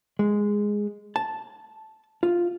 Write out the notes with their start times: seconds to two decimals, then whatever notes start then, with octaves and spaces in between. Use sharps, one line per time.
0.19 G#3
1.16 A5
2.23 F4